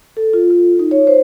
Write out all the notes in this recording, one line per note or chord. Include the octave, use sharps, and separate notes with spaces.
A4
F4
F4
D#4
C#5
C5